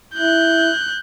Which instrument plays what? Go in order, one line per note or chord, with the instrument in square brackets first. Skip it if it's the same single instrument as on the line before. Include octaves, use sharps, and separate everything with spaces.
[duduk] E4 [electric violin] F#6 G6